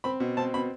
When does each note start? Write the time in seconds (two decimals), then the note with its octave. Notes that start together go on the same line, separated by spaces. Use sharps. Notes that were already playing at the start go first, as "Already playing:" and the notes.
0.04 C4 B5
0.20 B2
0.37 C4 A5
0.54 B2 B5